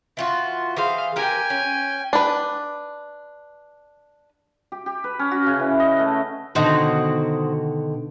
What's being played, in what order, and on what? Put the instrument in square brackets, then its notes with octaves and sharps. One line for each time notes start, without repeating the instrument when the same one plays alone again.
[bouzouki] E3 F4 F#4
[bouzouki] E3 G#4 C5 [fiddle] F5
[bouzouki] G4 A#4 [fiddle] G5 G#5
[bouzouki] C#4
[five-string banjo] D4 B4
[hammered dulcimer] G4
G4
B4
C#4
F#4
C#3
E3
D#5
A3
[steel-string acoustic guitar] B2 D3 D#3 [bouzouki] D#4 F#4 C5